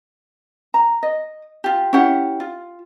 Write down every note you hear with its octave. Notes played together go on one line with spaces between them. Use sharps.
A#5
D#5
F4 G4
C#4 E4 G4 F#5
F4